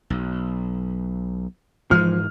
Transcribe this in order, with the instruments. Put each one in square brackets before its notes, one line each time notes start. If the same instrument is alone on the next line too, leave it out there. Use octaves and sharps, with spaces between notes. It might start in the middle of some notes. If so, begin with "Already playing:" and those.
[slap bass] B1
[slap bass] G#2 E3 G#3 [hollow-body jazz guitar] F3 [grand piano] F6